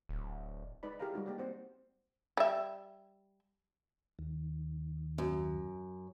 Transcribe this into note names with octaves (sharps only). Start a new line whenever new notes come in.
D1
G#3 D#4 B4 D5 B5
E4 G4 G#4 A#4 F5 A#5
G3 G#3 D#4 F#4
A#3 G4 D5
C4 C5 F#5
G3 E5
D#2
F#2